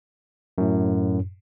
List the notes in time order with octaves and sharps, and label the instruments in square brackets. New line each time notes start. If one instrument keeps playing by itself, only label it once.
[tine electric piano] F#2 A2